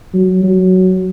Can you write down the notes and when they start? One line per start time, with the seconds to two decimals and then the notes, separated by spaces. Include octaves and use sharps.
0.14 F#3
0.43 F#3